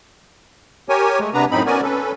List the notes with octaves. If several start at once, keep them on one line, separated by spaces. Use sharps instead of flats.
G4 A#4 C#5 G#5
G#3 A3
C3 B3 D4 B4 A#5
F#2 A2 C4 D#4 B5
B3 C#4 F#4 A#4 D5 G#5
C#4 A4 B4